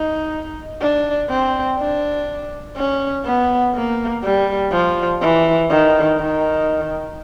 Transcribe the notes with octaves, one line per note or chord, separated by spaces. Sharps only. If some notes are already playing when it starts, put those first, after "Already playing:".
Already playing: D#4
D4
C4
D4
C#4
B3
A#3
G3
F3
E3
D#3
D#3